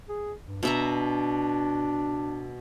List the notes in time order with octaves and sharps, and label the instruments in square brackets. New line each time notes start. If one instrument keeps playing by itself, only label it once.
[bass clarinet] G#4
G2
[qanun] B2 E5 A#5 [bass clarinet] D4